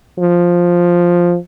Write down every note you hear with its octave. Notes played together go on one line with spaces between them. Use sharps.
F3